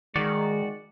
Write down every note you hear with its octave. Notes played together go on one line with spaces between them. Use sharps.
D#3 G#3 F#4 D5